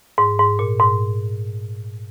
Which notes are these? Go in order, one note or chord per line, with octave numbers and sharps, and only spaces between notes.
G#2
G#2
A#2
G#2